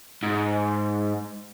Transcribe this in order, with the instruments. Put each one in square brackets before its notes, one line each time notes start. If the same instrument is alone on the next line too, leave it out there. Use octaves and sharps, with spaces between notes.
[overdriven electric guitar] G#2